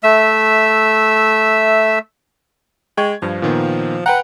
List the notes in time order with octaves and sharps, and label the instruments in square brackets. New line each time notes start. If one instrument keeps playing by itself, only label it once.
[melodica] A3 E5 E6
[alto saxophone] G#3 [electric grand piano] G5 C#6 G#6
[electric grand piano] G2 [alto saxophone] F3
[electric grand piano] A#2 D#3 B3
[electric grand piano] B4 G5 A#5 [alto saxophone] F#5